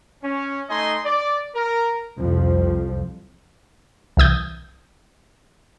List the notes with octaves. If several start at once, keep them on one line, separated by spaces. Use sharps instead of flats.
C#4
A3 D#4 D#5 G#5 C6
D5
A#4
C2 F2 F3
C2 E3 D#6 G6